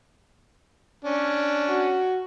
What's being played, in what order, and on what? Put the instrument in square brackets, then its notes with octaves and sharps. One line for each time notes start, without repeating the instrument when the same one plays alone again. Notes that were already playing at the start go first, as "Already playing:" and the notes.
[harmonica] C#4 D4
[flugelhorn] F#4